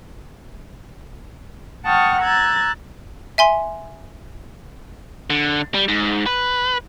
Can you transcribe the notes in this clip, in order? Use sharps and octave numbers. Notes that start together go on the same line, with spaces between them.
F#5 G5 A5 C#6 D#6 F6
A#5 E6 F#6 G#6 A6
E5 G#5 C6
D3
G3
G#2
B4